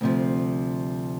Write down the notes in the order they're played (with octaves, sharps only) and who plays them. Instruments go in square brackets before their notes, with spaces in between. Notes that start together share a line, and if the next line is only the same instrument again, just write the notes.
[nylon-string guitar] D2 C3 F3